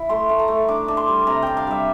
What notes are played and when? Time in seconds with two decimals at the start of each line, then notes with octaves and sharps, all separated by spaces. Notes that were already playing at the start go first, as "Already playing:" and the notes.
Already playing: E4
0.09 A3 C6
0.29 A3
0.39 A#5
0.48 A3
0.68 D4 D6
0.88 D4
0.97 C6
1.08 G3
1.27 C3 A#5
1.42 D4 G5
1.57 F5
1.67 G3 E5